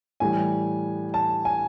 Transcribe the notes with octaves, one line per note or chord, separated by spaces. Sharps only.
A2 E3 G3 G#5
A5
G#5